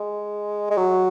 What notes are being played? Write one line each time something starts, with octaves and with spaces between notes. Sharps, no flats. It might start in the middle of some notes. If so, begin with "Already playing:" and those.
Already playing: G#3
G#3
F#3